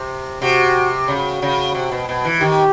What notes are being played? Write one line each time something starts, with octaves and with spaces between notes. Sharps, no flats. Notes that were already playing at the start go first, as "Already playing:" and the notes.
Already playing: C3
C3 F#4
C#3 F#4
C#3
C3
B2
B2
E3
D#3 G4